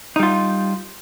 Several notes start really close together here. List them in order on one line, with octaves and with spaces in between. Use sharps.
D#4 G3 F4